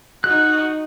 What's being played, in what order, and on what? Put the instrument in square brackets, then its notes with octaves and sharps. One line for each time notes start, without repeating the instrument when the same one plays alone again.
[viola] D#4 F#4 [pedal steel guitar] F#6